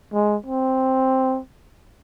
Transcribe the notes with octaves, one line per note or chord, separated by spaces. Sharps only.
G#3
C4